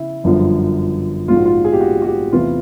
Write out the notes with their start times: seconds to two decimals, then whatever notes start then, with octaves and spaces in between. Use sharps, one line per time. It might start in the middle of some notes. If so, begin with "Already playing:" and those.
Already playing: C#3 E4
0.24 G1 F#2 D3 F3
1.28 A#1 G#2 F3 F4
1.36 F#4
1.45 F4
1.64 G#4
1.73 G4
1.81 F#4
2.02 F#4
2.06 G4
2.32 E2 C3 E3 A3 F4